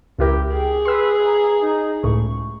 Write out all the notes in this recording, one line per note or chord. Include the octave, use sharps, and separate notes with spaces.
C#2 E4 G4 A#4
G#4 G5
B4 C6 E6
A#5
D#4
C#2 A2 C#6